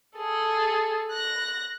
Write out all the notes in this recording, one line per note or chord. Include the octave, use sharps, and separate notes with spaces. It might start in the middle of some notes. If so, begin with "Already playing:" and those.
G#4 A4
F#6 A#6